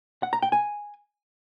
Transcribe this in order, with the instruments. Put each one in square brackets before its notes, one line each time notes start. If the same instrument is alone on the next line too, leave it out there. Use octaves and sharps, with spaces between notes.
[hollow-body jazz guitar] F#5
A#5
G5
G#5